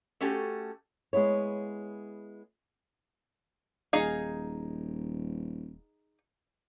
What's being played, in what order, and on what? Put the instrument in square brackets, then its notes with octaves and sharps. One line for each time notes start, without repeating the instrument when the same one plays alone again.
[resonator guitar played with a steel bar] A3 C#4 F#4 G4 A4
[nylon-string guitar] G#3 B3 E4 C#5
[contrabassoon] D#1 [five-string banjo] D#4 G#4 F5